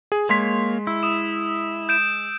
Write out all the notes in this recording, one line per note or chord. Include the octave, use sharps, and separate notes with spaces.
G#4
G#3 A#3 C#5 C6 B6
E4 E6
D#6 E7
G6 D7 E7